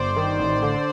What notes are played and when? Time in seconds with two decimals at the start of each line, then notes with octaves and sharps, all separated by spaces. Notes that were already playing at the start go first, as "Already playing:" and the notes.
Already playing: G1 C5 D5
0.16 D#3
0.39 A1
0.62 D3